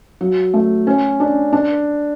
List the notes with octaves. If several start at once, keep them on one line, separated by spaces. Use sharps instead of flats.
F#3
A3
C#4
D4
D4